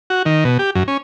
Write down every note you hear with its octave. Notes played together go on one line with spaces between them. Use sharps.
F#4
D#3
B2
G4
F#2
C#4